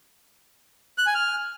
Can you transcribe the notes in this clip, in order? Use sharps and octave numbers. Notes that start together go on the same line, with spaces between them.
F#6
G#5
F6